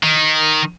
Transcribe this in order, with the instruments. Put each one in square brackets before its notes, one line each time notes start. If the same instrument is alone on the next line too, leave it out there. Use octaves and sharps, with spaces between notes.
[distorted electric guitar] D#3